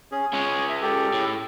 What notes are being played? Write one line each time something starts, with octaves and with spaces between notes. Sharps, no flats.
C#4 G#4
G#3 C#4 C#5
E5
G4 A4
A2